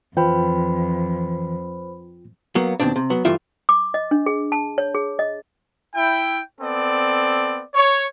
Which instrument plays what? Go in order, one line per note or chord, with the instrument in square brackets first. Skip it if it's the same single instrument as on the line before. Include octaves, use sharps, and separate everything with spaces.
[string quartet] F2 [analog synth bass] E3 [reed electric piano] F4 G5 [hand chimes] B4 C5 B5
[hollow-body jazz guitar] F#3 A#3 B3
D#2 G#2 B2 C4 D4
C3
F#3 B3
G2 E3 A3 F4 E5
[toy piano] D6
D#5
D4
G#4
A5
C#5
G#4
D#5
[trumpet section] E4 G5
B3 C4 A4 D5
C#5